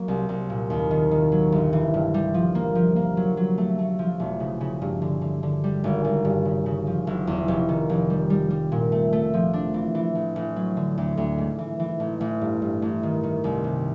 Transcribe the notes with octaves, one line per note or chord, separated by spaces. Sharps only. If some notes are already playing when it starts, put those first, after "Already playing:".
Already playing: F#3 A#3
C2
C2
A#2
D#2
D#3
D#3
F#3
G1
E3
G2
G3
F3
A#3
F3
A#3
F#3
F#3
A3
A3
F3
E1
C#3
C#3
G2
D3
D3
D3
G3
G#1
G#1
G2
C#3
C#3
F3
F#1
E2
F1
D#3
F1
G3
G3
G3
A#2
A3
A3
F3
D4
E3
E3
A1
A1
F#3
D3
D2
D2
G#2
E3
E3
A1
A1
G2
G2
A1
D#3
D#3
C2
C3